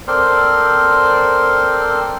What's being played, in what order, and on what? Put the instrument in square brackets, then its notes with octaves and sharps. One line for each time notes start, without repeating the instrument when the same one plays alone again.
[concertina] C4 A4 A#4 C5 D5 C6